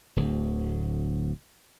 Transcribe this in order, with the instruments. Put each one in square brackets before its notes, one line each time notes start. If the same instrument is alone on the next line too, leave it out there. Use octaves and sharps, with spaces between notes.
[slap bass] D1 D2